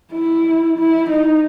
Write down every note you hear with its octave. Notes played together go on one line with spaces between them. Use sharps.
E4
E4
D#4